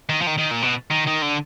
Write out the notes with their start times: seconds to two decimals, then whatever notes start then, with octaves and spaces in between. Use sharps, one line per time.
0.09 D#3
0.21 F3
0.27 D#3
0.38 D#3
0.51 A#2
0.62 B2
0.91 D#3
1.07 D#3
1.22 D3